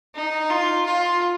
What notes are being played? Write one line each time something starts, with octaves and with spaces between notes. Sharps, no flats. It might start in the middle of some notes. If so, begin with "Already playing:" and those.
D#4
F4
F4